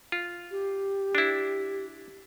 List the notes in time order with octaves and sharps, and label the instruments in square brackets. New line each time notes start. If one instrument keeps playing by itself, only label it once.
[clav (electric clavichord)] F4
[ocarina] G4
[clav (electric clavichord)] D4 E4